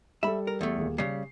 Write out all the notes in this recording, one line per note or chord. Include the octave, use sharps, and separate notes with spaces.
G3 A4 E5 B5
A#4
E2 A3
D#1 A#3 G#4
C#3 G3 C7